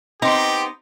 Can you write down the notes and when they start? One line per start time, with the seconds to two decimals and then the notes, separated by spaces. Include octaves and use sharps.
0.22 B3 C4 D#4 G4 A#5 C6